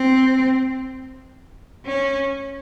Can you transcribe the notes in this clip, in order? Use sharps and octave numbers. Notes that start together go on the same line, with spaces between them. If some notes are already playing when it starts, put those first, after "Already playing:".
Already playing: C4
C#4